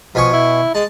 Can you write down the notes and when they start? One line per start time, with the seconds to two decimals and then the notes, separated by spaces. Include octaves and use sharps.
0.15 B2 F3 G#5 C#6
0.33 E4
0.75 G#3 A5